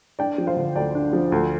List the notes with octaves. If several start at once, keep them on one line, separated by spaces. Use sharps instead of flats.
D4 D5 G5
F3
C5 F5
D3
D2 D5 G5
D4
F3
D2